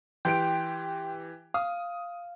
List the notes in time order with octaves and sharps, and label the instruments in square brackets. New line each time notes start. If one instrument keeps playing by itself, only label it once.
[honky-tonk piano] E3 G4 D7 [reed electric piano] G5 C6
[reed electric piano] F5 [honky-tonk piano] D#6